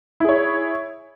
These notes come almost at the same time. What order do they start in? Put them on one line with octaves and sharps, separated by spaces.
E4 G#4 C#5